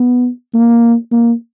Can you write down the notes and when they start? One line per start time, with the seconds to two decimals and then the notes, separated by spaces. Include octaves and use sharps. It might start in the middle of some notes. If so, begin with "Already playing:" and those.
Already playing: B3
0.54 A#3
1.12 A#3